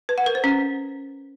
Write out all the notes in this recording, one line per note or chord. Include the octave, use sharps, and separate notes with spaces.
B4
F#5
A#4
C5
C#4